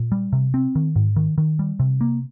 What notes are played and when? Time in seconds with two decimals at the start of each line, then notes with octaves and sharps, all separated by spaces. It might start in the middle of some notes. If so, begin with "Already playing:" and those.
Already playing: A#2
0.12 G3
0.33 C3
0.54 C4
0.75 D#3
0.96 G#2
1.16 D#3
1.38 D#3
1.59 G3
1.80 C3
2.01 A#3